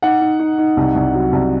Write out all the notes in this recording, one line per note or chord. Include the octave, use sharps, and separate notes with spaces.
D#4 F#5
D#4
D#4
D#4
C2
C2
F#3
C2